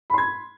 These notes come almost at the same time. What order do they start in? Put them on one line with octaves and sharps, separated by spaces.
B5 C6 G#6